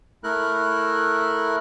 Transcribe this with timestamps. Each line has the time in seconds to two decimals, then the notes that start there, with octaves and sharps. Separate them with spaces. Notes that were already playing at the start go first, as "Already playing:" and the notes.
0.24 A3 E4 A#4 F#6